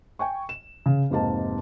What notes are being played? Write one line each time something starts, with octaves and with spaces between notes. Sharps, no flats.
G5 G#5 C#6
E7
C#3
F1 G#2 A#3 A5